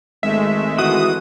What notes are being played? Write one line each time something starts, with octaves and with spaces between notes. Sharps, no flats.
G#1 G#3 A3 E5
E3 F#4 D#6